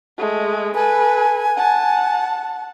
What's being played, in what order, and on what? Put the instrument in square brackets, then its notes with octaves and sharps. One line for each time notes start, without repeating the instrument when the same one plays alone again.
[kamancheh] G#3 A3
[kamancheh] A4 B4 [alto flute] G#5
[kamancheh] F#5 A5